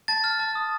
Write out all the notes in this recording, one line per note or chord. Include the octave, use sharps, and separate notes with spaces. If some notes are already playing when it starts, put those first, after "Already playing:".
A5 A6
F6
A5
D#6